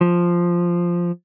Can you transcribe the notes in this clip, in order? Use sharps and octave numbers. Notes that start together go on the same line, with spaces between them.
F3